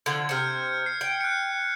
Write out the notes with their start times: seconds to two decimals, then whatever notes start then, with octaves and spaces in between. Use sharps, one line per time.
0.06 D3 F3 G#6
0.29 C3 C5 F6 G6 C#7
0.86 C7
1.01 G5
1.21 F#6 C#7